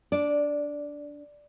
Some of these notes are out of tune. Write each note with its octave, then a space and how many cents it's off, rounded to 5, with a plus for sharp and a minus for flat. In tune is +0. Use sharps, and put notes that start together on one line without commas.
D4 -15 D5 +0